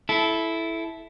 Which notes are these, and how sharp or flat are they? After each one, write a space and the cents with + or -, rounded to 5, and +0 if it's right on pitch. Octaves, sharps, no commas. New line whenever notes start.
E4 +0 A4 -15